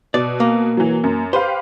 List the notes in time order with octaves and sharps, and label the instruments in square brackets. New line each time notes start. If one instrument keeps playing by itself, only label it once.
[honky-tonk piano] B2 [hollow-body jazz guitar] D5
[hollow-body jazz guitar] A#3
[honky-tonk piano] E3 F#3
F#2
[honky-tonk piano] G4 B4 F5 [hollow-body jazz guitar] C5